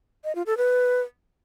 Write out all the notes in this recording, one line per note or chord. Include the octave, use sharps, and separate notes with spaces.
D#5
F4
A4
B4